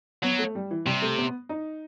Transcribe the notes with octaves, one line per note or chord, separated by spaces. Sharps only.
F#3 B3
A3
G3
E3
C3 G3
A3
B3
D#4